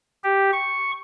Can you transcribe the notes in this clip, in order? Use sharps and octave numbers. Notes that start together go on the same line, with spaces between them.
G4
C#6